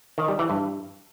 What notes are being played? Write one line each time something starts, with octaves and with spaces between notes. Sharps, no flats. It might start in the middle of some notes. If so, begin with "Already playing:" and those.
D#3
G3
E3
G2